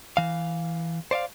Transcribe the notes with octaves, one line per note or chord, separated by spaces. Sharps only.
E3 F5
C5 D5 E5 F5